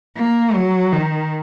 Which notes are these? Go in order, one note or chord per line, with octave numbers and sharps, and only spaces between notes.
A#3
F#3
D#3